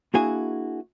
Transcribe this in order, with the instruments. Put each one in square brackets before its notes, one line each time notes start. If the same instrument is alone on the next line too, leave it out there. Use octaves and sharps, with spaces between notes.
[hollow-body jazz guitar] A#3 D4 E4 F#4 G#4 G#5